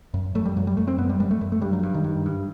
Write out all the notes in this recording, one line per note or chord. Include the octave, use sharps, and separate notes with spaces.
F#2
F#2 A3
G3
F#2 F#3
G3
F#2 A3
C4
F#2 B3
G3
F#2 G3
A3
F#2
A3
G2 G3
F#3
G2
D#3
G2
G2